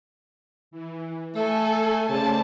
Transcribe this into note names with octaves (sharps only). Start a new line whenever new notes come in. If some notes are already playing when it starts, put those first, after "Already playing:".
E3
A3 A4 G#5
C#3 A3 C5 D5 A5